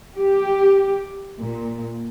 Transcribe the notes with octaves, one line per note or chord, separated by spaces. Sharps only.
G4
A#2